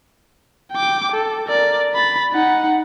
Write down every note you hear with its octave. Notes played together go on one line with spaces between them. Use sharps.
G5 D6
A4
A#4 D5
B5 A6
D#4 F#5